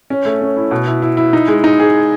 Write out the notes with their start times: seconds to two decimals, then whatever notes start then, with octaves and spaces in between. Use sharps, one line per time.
0.10 C#4
0.25 A3
0.41 C#4
0.57 E4
0.71 B2
0.87 E4
1.02 E4
1.17 E4
1.33 D#4
1.48 G#3
1.64 D#4
1.80 G#4